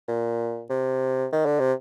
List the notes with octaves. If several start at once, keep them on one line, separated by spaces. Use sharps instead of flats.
A#2
C3
D#3
D3
C3